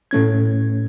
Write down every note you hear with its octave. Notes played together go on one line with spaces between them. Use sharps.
A2 A3 C#4 G#6